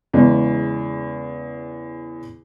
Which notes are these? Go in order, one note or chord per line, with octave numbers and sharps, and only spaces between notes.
E2 C#3 G#3